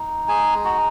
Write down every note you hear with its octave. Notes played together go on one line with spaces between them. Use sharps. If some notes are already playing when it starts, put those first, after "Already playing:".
Already playing: D#4
G#3 G#4 G#5
D#4 F#4